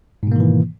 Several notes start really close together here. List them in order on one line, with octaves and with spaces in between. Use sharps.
G#2 B2 A#3 D#3 E3